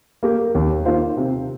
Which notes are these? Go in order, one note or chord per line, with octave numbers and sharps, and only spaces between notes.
A#3 G4 A#4
D#2
D#3 A#3 F4 C5
C3